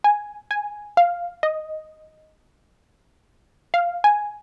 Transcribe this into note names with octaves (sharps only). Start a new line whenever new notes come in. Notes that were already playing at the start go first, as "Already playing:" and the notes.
G#5
G#5
F5
D#5
F5
G#5